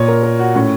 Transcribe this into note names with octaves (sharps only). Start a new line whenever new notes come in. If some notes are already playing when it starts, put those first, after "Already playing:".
Already playing: A#2 C#5
A#4
A#4
F#4
A2 C#4